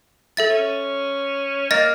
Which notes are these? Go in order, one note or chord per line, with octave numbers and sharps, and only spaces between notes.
A4 E5 A6
C#4
A#3 D#5 A6 A#6